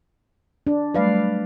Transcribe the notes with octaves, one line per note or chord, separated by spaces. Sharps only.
D4
F#3 G3 A3 B4 D5 F5